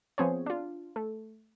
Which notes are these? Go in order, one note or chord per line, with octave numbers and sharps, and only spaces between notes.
F3 B3 C4 G#4 C5 C#5
D4 F4
A3